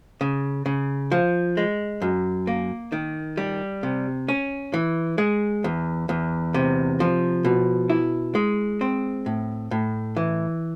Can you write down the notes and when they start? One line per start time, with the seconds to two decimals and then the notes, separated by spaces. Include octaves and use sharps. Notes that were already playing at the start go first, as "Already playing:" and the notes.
0.21 C#3
0.66 C#3
1.12 F3
1.57 G#3
2.02 F#2
2.47 A#3
2.92 D#3
3.37 G3
3.83 C3
4.28 C#4
4.74 E3
5.18 G#3
5.64 E2
6.09 E2
6.54 C3
7.00 F3
7.45 B2
7.90 E4
8.35 G#3
8.81 C4
9.26 A2
9.71 A2
10.16 E3